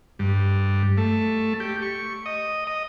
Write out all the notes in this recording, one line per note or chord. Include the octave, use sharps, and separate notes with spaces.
G2
A3
G4
C#6
D#5
D#5